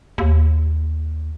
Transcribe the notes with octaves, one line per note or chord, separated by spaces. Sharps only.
D#2